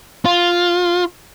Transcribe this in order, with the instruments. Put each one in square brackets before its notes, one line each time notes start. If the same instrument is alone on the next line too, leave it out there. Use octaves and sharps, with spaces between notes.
[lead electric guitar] F4